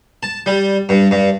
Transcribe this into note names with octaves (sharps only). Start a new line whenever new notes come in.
A5
G3
G2
G2